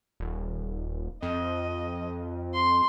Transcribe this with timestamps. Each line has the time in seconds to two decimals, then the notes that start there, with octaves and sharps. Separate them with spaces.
0.20 D#1
1.23 F2 D#5
2.54 C6